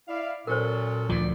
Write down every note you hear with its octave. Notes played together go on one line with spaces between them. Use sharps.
E4 D5 F5
A#2 F#3 C#4 A4 A#4 C5
D2 F3 F4 D5